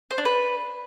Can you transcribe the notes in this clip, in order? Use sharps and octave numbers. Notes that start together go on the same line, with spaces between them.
C5
D4
B4